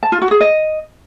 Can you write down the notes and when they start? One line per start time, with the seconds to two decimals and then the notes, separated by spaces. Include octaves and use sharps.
0.03 A5
0.12 F4
0.22 F#4
0.31 G#4
0.41 D#5